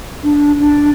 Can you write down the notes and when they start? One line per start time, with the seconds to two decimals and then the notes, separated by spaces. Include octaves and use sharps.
0.23 D4
0.59 D4